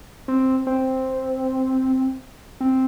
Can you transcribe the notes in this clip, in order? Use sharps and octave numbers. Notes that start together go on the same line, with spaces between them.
C4
C4
C4